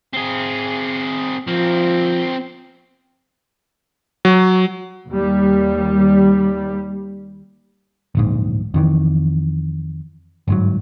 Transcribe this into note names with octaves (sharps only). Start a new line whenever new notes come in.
C4 G#4
F3 C4 A#4
F#3
D#2 G3
D1 A#1 G#2
F2 D#3 E3
G1 G#2 F#3